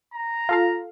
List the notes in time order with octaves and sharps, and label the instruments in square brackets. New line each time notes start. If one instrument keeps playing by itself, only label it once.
[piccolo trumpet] A#5
[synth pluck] F4 A4 F5